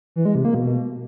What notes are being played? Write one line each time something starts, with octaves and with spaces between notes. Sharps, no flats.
E3
G#3
C3
A#3
B2